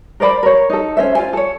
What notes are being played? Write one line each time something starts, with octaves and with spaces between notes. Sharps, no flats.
A#4 C5 D5 B5
A#4 C#5
D#4 A4
C#4 C5 E5
F4 C5 G#5
A4 C#5